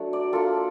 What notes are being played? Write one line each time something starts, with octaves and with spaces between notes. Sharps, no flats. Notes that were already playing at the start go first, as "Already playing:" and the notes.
Already playing: F#3 A3 D4
D5
A#3 D4 F4 A4